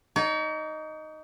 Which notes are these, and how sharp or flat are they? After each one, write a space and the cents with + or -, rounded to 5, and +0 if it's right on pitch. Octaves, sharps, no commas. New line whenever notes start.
D#4 +0 C#5 +45